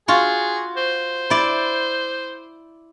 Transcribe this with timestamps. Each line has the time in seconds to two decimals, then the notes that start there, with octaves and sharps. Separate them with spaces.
0.08 F4 F#4 G#4
0.77 C5
1.30 E4 D5